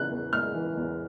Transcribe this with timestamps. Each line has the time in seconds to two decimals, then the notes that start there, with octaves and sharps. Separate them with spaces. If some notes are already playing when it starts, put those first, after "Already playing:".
Already playing: C#3 E3 F#6
0.11 E2
0.33 G#3 F6
0.55 E3
0.77 E2